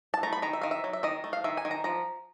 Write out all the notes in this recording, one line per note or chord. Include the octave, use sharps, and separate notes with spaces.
A5
A3 A#5
B5
D#3 A#5
E5
D#3 F5
E5
F#3
E5
D#3 D#5
A3
F5
D#3 E5
G#5
D#3
A#5
F3 A#5